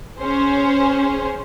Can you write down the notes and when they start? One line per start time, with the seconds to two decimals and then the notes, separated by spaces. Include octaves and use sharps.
0.19 C#4 G#4 C5